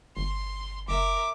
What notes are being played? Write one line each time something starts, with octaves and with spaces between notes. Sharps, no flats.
G1 C6
F#1 A#4 E5 D6